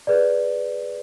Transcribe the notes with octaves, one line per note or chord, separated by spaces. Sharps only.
G#4 B4 D5